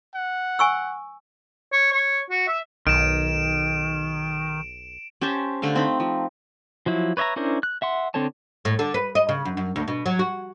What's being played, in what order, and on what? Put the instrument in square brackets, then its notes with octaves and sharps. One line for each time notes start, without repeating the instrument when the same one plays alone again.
[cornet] F#5
[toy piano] G#5 C#6 E6
[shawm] C#5
C#5
F#4
E5
[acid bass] B1 [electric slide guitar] D#3 [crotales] D7 E7
[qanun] C#4 G4 C5 A5
D3 A3 C5 F5
C4 D#4 B5
F3
[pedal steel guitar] F3 F#3 E4
B4 C#5 D#5 E5 A#5
C#4 D4 E4 A#4 C5
F#6
E5 F#5 C6
D3 C4 A4 C#5 A5
[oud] A2
D3
B4
D#5
C#3
F#2
F#2
D2
B2
F#3
F#4